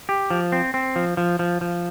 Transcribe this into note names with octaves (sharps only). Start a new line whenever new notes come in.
G4
F3
C4
C4
F3
F3
F3
F3